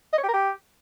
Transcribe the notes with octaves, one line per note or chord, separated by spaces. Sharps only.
D#5
C#5
G4
A#4
G4